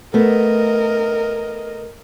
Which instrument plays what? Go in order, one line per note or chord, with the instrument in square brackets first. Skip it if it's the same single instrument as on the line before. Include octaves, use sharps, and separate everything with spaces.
[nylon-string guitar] A3 B3 [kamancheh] A#4 D#5